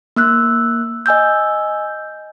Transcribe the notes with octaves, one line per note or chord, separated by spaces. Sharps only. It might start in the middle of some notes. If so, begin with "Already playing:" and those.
A#3 E6 F#6
D#5 G#5 E6 G6